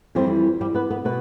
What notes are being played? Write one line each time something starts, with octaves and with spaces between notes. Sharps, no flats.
F2 E3 G3 C4 C5
G3 G4
B3 B4
B3 B4
B2 B3 B4